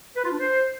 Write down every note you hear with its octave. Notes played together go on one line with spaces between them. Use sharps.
B4
F4
D4
C5